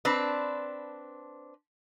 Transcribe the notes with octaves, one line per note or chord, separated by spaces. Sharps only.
C4 D4 B4